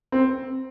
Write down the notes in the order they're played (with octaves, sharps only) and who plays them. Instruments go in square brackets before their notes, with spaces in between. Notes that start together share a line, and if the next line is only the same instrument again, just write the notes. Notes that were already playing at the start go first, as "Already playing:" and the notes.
[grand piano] C4